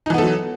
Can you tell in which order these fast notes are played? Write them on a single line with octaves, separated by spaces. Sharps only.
D#4 E3 B3 A4 F#3